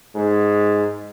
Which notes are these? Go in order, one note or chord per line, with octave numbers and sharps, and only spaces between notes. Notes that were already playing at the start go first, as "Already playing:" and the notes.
G#2